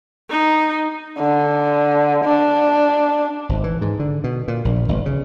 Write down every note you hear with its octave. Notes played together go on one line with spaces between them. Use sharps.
D#4
D3
D4
G#1
E3
G#2
D3
B2
A#2
A#1
G1
C#3